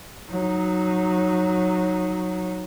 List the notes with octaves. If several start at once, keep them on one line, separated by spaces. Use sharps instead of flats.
F#3 D#4